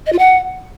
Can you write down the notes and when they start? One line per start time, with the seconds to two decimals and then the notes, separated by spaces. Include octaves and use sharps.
0.07 D#5
0.13 F4
0.19 F#5